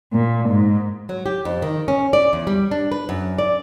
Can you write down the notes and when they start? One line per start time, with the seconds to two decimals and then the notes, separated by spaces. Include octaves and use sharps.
0.13 A#2
0.49 G#2
1.09 F#3
1.26 G4
1.45 F2
1.62 D#3
1.88 C#4
2.13 D5
2.33 E2
2.47 G3
2.71 D4
2.92 B4
3.09 F#2
3.38 D5